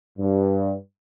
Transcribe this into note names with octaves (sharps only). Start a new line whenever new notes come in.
G2